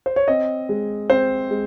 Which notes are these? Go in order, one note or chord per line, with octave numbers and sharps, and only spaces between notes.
C5
C#5
C4 D#5
G#3
C4 C5
G#3